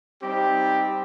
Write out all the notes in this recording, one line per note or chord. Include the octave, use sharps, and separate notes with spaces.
G3 C4 D#4 G4